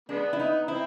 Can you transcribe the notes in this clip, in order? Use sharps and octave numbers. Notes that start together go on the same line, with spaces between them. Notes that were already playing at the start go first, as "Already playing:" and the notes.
G#3 B3 D4
E4
D#4
C4 E4